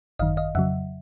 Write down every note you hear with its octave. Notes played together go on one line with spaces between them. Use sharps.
G#1 F#2 D#3 D#5 F5
D#5 F5
F2 C#3 F#3 E5 F#5